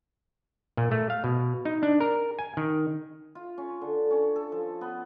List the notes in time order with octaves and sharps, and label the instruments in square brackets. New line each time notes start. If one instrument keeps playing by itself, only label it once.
[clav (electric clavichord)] A#2
A3
F5
B2
D#4
D4
A#4
G#5
D#3
[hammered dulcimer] F4
C#4
D3
C#4
A4
F3
B3